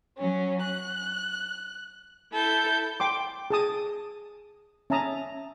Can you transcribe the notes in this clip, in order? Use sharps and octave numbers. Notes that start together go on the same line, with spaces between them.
F#3 C#4
F#6
E4 A4 G6
G5 C6 D6
G#4 A5 D#6
C#4 E5 A5 A#5 D#6